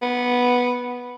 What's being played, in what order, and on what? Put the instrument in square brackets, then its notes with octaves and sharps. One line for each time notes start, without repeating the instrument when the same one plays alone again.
[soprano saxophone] B3